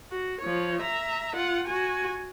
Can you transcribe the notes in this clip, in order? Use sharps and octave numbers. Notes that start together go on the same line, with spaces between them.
F#4
F3 C#5
E5 A#5
F4 F#5
F#4 G#5